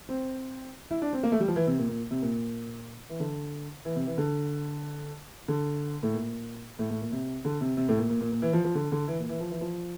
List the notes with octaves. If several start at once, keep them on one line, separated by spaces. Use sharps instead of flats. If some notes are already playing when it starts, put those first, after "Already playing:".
C4
E4
D4
C4
A#3
A3
G3
F3
E3
C3
A#2
A#2
C3
A#2
E3
D3
E3
C3
E3
D3
D3
A2
A#2
A2
A2
A#2
C3
D3
C3
C3
A2
A#2
A#2
A#2
A#2
E3
F3
F3
D3
D3
E3
A#2
E3
F3
E3
F3